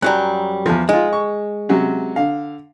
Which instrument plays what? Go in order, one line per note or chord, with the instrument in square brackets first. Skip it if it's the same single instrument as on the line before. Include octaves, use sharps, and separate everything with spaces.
[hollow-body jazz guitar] F#2 F#3 G3 [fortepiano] F#6
[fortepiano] E2 F3
[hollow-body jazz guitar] G#3 [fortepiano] D#4 F4
[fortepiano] C#6
C3 F#3 C#4
D3 F5